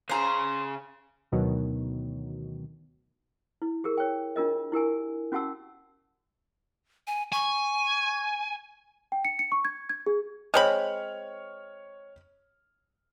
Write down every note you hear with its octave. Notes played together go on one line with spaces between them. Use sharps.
C#3 G#4 C5 A#5
D2 B2 D#3 F#3
E4
G4 G#4 A#4
C#5 G5
D4 F4 A#4 D#5
E4 G4 A#4 G#5
C#4 F#4 G4 F#5 A5 E6
G#5
G#5 C#6
G5
C#7
C#7
C#6
G#6
G#6
G#4
G#3 C4 C#5 B5 F6